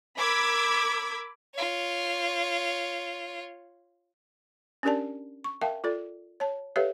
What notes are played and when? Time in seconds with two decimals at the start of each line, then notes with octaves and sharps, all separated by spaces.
0.17 A#4 B5 D6 E6 G#6 B6
1.54 F4 C#5
4.83 C#4 D4 G4 A#4 D5 A5
5.44 C#6
5.62 A#4 E5 F5 G5 A5
5.84 F4 A4 D5
6.40 C#5 A5
6.76 G4 A4 B4 C#5 E5 F5